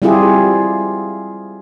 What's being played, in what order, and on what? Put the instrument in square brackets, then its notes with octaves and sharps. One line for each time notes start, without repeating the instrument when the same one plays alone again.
[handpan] G3 C4 E4 F4 G4 G#4